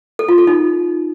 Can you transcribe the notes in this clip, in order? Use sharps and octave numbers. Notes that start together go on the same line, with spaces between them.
A4
F4
A4
D#4